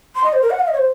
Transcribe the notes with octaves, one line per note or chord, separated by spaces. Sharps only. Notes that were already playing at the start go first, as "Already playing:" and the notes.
C6
D#5
C5
A#4
F#5
F5
D#5
C#5
C5